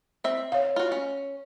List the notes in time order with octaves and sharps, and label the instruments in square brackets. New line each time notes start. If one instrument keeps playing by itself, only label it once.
[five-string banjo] C4 E5
[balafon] C#5 F5
[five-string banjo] F4 F#4
C#4